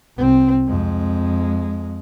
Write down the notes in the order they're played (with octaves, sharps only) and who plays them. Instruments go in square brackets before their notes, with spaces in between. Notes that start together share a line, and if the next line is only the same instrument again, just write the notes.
[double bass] C2 C4
F2 G#3